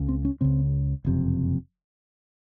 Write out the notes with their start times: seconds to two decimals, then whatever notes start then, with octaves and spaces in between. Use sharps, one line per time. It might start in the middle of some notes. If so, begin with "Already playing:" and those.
Already playing: C#2 C#3
0.09 C4
0.25 C#4
0.41 C#2 C#3 C4
1.05 F#1 F2 C3